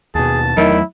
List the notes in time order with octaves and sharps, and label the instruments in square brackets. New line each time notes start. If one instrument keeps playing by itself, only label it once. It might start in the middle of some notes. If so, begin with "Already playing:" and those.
[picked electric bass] D#2 B2 [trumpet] G#4 [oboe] A5
[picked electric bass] E2 F#3 A3 [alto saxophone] D#3 [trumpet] E4